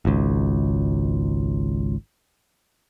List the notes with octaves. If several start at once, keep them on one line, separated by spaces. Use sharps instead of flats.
G#1 C#2